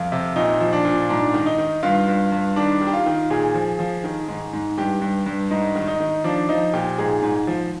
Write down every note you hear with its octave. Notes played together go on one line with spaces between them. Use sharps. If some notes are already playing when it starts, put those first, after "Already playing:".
Already playing: F2 F4
C3
A#2 D#4
F3
D4
A#2
G#2 D4
D#3
D#4
D#3
G2 F4
G2
G2
D#3 D4
D#3
G4
F4
D#3
A#2 G#4
F3
F3
D#3
G#2
G#2
G2 G4
G2
G2
G#2 D#4
D#3
D#4
D#3
F3 D4
F3 D#4
A#2 G4
G#2 G#4
G#2
F3